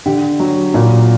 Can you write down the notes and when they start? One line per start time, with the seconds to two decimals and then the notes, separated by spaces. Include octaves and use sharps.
0.06 D3 G4
0.40 F#3
0.74 A#2